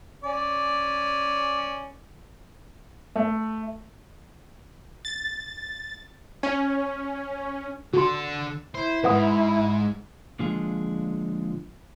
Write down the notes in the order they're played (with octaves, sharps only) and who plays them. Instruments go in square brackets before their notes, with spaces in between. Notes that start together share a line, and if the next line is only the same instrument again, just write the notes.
[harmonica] C#4 D5
[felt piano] A3
[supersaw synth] A6
C#4
[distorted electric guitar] D3 A4 [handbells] F#4 C6
[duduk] E4 [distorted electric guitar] C5
[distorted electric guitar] F2 G#2 [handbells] B4 F#5 D#6
[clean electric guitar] A#2 D3 F3 G#3 G#4